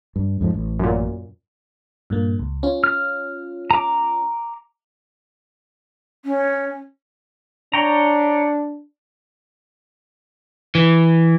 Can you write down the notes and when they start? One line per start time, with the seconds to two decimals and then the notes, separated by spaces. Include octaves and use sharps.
0.16 G2
0.41 F2 G#2 F3
0.54 A1
0.79 F#2 A#2
2.10 G2 A#2 A#3
2.39 C#2
2.63 C#4 F4
2.84 F6
3.71 A#5 D6
6.25 C#4
7.74 D4 C#5 G5 A#5
10.75 E3